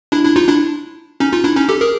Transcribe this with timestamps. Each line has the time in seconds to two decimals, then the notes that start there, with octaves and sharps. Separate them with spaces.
0.12 D4 E4
0.25 D4 E4
0.36 D#4 F4
0.48 D4 E4
1.20 C#4 D#4
1.33 D#4 F4
1.44 D4 E4
1.56 C#4 D#4
1.69 G4 A4
1.81 G#4 A#4